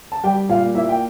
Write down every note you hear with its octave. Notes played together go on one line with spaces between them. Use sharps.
A5
G3 G4 G5
A#2 F4 F5
A#3 E4 E5
G5